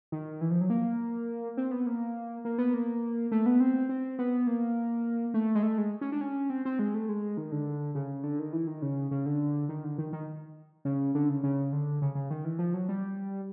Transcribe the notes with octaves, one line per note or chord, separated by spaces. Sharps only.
D#3
E3
F3
F#3
A#3
C4
B3
A#3
A#3
B3
A#3
A3
B3
C4
C4
B3
A#3
A3
G#3
A3
G#3
C#4
D4
C#4
C4
C4
G#3
A3
G#3
D#3
D3
C#3
D3
D#3
E3
D#3
C#3
C#3
D3
D#3
D3
D#3
D#3
C#3
D3
C#3
C#3
D3
C#3
C#3
D#3
E3
F3
F#3
G3